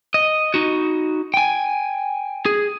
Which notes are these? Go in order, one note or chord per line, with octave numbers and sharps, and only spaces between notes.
D#5
D#4 F#4
G5 G#5
G#4